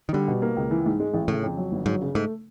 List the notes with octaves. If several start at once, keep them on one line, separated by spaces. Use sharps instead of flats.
D#3
D3 G3
B2
A#3
C#2
E3
G#2
G#3
A1
A2 C#3
F2
F#3
G1
G#2 F#3
C#3
G#2 A3